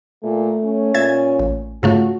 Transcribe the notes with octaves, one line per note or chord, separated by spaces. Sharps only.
A#2 A3
C#4
A#2 E5 G#6 A6
A1
G#2 C#3 A3 F4 F#4